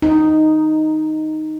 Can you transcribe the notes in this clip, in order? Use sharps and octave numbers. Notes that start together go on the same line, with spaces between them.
D#4